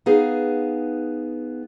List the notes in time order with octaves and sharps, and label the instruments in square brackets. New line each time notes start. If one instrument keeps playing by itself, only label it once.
[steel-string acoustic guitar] B3 D#4 G#4 F5